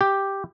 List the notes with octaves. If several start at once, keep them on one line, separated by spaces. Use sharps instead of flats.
G4